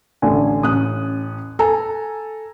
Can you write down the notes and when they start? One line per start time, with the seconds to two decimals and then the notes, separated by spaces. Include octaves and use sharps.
0.22 A1 D3 G#5
0.63 A1 C#4 D#6 F#6
1.59 A4 G#5 A#5